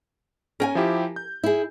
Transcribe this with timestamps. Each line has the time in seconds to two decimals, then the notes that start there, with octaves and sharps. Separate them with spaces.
0.60 C#4 A#4 G5 G#5
0.75 F3 E4 G4
1.16 G6
1.44 E4 G#4